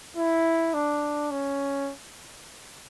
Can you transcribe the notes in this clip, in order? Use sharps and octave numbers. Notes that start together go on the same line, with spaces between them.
E4
D4
C#4